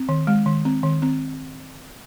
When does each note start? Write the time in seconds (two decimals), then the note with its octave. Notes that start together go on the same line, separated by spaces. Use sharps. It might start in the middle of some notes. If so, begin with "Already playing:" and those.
Already playing: C4
0.09 D#3
0.27 G#3
0.46 D#3
0.65 C4
0.83 D#3
1.02 C4